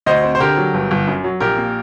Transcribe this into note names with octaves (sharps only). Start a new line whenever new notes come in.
D2 C5 D#5
C4
C5
D3 G4 A#4
F#3
G1
G1
F#2
F#3
A#1 G4 A#4
A#3